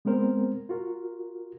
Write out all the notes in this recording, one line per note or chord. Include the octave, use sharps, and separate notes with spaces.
G#3 B3 C4 A#4 C5
F4 F#4 A#4